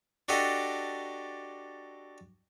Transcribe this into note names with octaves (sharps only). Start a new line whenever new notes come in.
D4 F#4 G4 A4 D#5